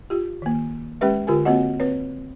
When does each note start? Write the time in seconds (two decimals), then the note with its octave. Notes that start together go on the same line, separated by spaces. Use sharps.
0.10 F4 G4
0.42 D#3 A#3
1.01 G#3 C#4 G4 B4 E5
1.27 D3 F4 G4 A#4 G#5
1.45 A#3 C4 F#4 C#5 D#5 F#5
1.80 C4 B4 C#5